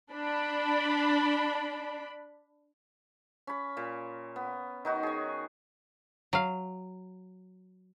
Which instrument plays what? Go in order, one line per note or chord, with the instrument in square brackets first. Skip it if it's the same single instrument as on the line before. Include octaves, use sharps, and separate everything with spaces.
[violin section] D4 B5
[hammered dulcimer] C#4 B5
A#2
B3
D#3 D#4 F#4
G#4 C#5
[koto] F#3 F5